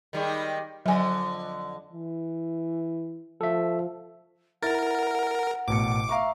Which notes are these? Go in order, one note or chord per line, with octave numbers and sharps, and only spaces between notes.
D#3 G3 G#3
F2 D3 F#3 D#5 G#5
E3
F3 A4 E5
E4 A#4 F#5 A6
A1 B2 D6 C#7
E5 F5 A#5 C#6